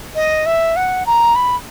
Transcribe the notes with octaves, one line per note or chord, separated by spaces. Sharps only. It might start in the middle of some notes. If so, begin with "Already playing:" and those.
D#5
E5
F#5
A#5
B5